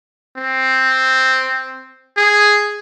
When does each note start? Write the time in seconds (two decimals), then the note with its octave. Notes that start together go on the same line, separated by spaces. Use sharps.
0.37 C4
2.17 G#4